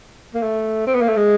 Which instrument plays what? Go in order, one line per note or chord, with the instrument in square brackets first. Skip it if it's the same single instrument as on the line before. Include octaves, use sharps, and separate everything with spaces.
[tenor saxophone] A#3
A3
C4
B3
A#3
A3
G#3